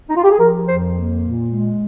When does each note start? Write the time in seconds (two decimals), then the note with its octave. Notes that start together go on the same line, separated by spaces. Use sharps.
0.09 D#4
0.16 F4
0.24 G4
0.31 G#4
0.39 F3 A#4
0.67 F2 C5
0.94 A#3
1.22 A#2
1.49 G#3